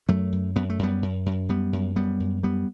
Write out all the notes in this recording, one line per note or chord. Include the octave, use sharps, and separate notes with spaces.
F#2 F#3 A3
F#2
F#2 B3
A3
F#2 G3 B3
F#2
F#2
F#2 G3 B3
F#2
F#2 G3 B3
F#2
F#2 G3 B3